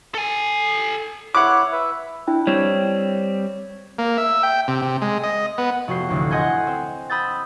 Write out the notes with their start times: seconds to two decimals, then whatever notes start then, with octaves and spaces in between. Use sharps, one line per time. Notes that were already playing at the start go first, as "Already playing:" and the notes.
0.15 A4 G#5
1.35 E4 C#5 F#5 D6 F#6
1.72 B4 E5
2.27 D4 E4 G5
2.47 G3 C4 C#5
3.99 A#3
4.18 E5
4.43 G5
4.68 C3
4.82 C3
5.02 G#3
5.23 D#5
5.58 B3
5.88 F1 F#4 G6 C7
6.09 A1 D2
6.30 D#5 F#5 G#5 C6 G6 G#6
6.67 C4
7.10 B5 D#6 E6 G6 A6